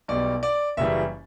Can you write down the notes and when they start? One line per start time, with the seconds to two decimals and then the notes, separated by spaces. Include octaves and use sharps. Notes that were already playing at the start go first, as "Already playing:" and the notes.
0.08 B1 B2 G3 D5
0.43 D5
0.77 F#1 F#2 C#3 E3 G3 E5